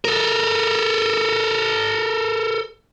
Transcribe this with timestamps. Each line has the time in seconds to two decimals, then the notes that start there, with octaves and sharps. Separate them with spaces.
0.05 A4 A#4